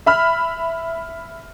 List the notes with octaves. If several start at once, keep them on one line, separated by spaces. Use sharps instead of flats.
E5 B5 F6